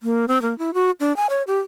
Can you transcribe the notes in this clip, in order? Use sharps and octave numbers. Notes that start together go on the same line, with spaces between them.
A#3
C4
A#3
E4
F#4
D4
G#5
C#5
G4